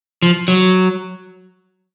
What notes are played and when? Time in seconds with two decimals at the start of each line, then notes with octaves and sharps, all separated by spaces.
0.22 F3
0.48 F#3